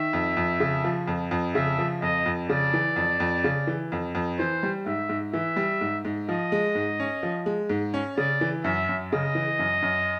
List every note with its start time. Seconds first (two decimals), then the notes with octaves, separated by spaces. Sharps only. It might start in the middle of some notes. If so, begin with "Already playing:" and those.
Already playing: D#3 E5
0.13 F2
0.37 F2
0.60 C#3
0.84 F3
1.08 F2
1.31 F2
1.55 C#3 E5
1.79 F3
2.02 F2 D#5
2.26 F2
2.49 C#3 D5
2.74 E3
2.96 F2
3.20 F2
3.44 C#3
3.67 E3
3.92 F2
4.15 F2
4.39 E3 C5
4.63 G3
4.86 G#2 E5
5.09 G#2
5.33 E3 E5
5.56 G3
5.81 G#2
6.05 G#2
6.28 F3 D#5
6.52 G#3
6.75 G#2
7.00 C#4
7.23 F3
7.46 G#3
7.70 G#2
7.94 C#4
8.17 C#3 D5
8.41 E3
8.64 F#2 E5
8.89 F#2
9.12 C#3 D#5
9.35 E3
9.59 F#2
9.82 F#2